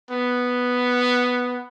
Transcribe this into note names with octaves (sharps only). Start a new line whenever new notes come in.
B3